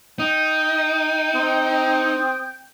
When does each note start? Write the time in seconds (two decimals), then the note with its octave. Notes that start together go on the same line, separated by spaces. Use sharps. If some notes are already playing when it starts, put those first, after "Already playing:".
0.19 D#4 G5 D#6
1.35 C4 D#6